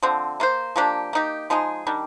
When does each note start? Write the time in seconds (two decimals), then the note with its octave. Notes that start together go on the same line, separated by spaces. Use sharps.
0.03 D3 F3 C4
0.40 A#3 F4 C5
0.76 F3 A#3 D4 G4
1.13 A#3 D#4 G4
1.50 F3 G#3 D#4 G#4
1.87 D#3 G3 D4